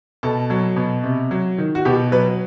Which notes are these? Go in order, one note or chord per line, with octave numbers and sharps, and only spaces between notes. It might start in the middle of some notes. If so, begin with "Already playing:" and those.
B2 A4
F#3
B2
C3
F#3
D#3
F#4
B2 G4
F#3 B4